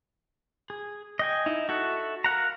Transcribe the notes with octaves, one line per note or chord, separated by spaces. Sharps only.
G#4
D#5 G5 G#5
D#4 E4
F#4 A4 E5 F#5
A#4 F5 F#5 A#5